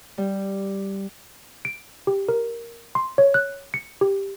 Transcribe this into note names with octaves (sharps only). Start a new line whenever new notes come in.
G3
D7
G4
A#4
C6
C#5
F#6
C#7
G4